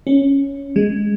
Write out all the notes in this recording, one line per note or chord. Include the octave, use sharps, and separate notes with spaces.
C#4
G#3